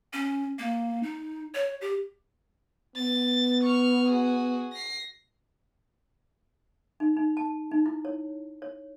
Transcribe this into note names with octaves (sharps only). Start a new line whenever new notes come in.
C#4
A#3
D#4
C#5
G4
B3 A6
C#6 F6
F#4 G#4
A#6 C7
D#4
D#4
A5
D#4
E4
C#5
C#5